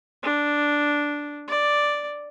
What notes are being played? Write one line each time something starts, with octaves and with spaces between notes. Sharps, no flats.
D4
D5